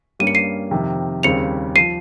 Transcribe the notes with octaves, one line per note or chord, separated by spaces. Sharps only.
G2 G3 A#3 C#4 D#7
C#7
C7 D#7
F2 C3 D#3
D#2 C#3 G3 C4 C#7 F7
F3 C7 D#7